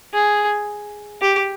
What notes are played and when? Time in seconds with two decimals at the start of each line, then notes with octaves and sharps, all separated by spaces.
0.14 G#4
1.22 G4